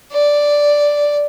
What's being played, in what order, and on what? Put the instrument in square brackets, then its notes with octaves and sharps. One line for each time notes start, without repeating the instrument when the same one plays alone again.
[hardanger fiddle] D5